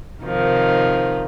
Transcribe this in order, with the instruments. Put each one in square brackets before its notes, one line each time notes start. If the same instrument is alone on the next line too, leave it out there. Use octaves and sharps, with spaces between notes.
[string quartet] C3 D#3 F3 D#4